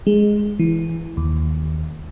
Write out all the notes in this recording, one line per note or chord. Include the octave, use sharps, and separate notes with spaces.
G#3
E3
D#2